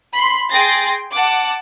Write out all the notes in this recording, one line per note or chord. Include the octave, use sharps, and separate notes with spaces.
B5 C6
G#4 G5 C6 A6 A#6
F#5 A5 D6